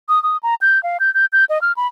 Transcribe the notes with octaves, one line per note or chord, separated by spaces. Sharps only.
D#6
D#6
A#5
G6
F5
G6
G6
G6
D#5
F6
B5